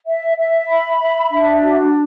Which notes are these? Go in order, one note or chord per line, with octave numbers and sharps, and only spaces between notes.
E5
E5
B5
E5
D4
F#4